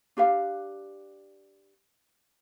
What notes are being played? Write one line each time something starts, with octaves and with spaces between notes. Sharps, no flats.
D4 G4 B4 F5